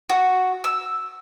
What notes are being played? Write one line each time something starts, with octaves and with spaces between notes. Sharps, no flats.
F#4
E6